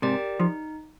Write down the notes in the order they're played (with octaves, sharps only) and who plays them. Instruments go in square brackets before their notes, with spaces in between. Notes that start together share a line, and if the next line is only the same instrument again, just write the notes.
[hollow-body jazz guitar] G#2 C3 [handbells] G4 A#4 D5 G5
[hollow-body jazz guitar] F3 [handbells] D#4